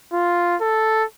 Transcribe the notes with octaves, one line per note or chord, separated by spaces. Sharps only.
F4
A4